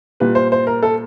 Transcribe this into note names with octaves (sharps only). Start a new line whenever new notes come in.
A#2 G3 B4
C5
C5
A#4
A4